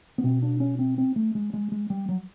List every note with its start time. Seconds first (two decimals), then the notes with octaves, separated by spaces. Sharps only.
0.18 B3
0.24 B2 C4
0.42 D4
0.60 C#4
0.79 C4
0.98 C4
1.16 A3
1.35 G#3
1.53 G#3
1.72 G#3
1.90 G3
2.09 F#3